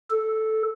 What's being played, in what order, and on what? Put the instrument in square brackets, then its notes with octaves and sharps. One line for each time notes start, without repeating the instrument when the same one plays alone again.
[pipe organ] A4